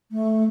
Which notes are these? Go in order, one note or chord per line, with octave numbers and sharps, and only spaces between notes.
A3